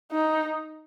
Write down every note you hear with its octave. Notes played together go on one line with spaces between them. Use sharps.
D#4